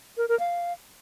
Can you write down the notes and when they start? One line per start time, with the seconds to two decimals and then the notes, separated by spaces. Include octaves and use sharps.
0.17 A#4
0.29 A#4
0.40 F5